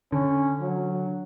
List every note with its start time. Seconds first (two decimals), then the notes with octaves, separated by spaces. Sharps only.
0.12 D3 C#4
0.61 F#3